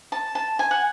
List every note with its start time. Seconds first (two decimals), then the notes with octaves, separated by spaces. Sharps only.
0.12 A5
0.35 A5
0.59 G#5
0.71 F#5